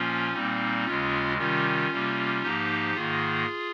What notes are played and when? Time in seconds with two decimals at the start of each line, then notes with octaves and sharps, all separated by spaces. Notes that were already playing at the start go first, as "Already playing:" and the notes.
Already playing: A#2 F3 A#3 C#4 F4
0.33 A#2 G3 A#3 C4 D#4
0.85 D#2 C#3 G#3 C#4 F4
1.37 C3 D#3 G3 C#4 F4
1.90 C3 G3 A#3
2.42 G#2 F3 A#3 D#4 G4
2.94 G#2 D#3 A#3 F4 G#4